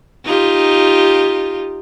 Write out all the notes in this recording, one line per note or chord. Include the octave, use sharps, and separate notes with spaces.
D#4 F4 G4